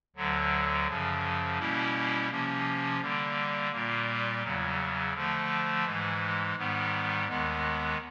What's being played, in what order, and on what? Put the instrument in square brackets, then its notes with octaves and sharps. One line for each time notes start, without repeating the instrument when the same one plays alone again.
[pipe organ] D2 D3 F#3
F#2 C#3 F3
B2 G3 A#3 C#4 E4
C3 F3 A#3 C#4
D3 G3 A#3
A#2 G3 A#3
E2 C#3 F#3
D3 F3 A3
G#2 E3 G#3
G#2 D#3 G3 B3
D#2 D#3 G#3 B3